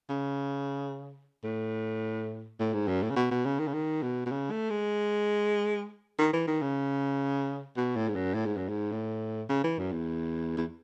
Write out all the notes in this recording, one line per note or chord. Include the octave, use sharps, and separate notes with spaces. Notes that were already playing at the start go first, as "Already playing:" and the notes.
C#3
A2
A2
G#2
F#2
A2
C#3
B2
B2
C#3
D#3
C#3
D#3
B2
B2
C#3
A3
G#3
D#3
E3
D#3
C#3
B2
A2
G#2
F#2
A2
G#2
F#2
G#2
A2
C#3
E3
F#2
E2
E2